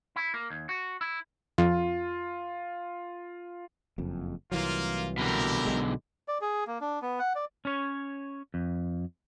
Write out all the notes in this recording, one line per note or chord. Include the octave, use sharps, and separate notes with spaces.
E4
A#3
D#2
F#4
E4
F2 F4
F#1 F2
C2 E3 F#3 A#3 F4
B2 D3 E4 G4 A#4
B1 G#3
D5
G#4
A#3
D4
B3
F#5
D5
C#4 C#5
F2